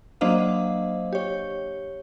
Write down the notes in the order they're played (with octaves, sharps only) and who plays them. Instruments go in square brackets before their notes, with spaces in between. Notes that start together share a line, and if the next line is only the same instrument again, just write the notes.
[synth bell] F#3 A#3 D4 C5 D#5 F5
G4 C#5